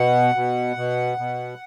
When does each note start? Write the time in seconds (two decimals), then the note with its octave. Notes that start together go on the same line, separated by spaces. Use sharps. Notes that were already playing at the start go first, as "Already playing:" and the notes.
Already playing: B2 F#5
0.35 B2
0.76 B2
1.18 B2